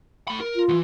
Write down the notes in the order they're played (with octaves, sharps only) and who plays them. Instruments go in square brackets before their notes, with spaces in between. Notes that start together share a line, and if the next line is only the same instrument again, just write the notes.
[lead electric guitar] A3 B5
A#4
[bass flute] F4
[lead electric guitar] D2 E3